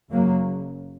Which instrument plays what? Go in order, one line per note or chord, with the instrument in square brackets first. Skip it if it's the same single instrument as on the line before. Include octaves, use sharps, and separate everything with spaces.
[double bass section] F#1 F#2 C#3 F#3 A#3